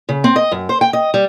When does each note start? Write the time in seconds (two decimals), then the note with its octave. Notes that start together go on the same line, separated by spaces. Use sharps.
0.09 C#3
0.24 C4
0.36 D#5
0.52 F#2
0.69 C5
0.81 G5
0.93 D#5
1.14 G3